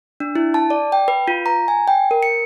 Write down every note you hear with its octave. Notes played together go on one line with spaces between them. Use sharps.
D4
E4
A5
D5
G5
B4
F4
A#5
G#5
G5
A#4
C#7